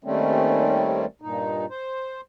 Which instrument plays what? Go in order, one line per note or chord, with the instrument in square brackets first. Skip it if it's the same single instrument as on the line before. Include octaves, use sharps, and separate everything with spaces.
[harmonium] D#2 D#3 G3 A3 C4 C#4
G2 A#2 D#4
C5